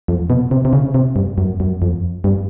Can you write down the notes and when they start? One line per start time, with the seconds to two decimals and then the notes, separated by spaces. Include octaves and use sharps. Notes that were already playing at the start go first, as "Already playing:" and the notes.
0.08 F2
0.30 B2
0.51 C3
0.65 C3
0.73 C#3
0.94 C3
1.16 G2
1.38 F#2
1.60 F#2
1.82 F2
2.24 G2